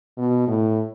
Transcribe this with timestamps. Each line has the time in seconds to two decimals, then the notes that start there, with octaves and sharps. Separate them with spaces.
0.18 B2
0.48 A2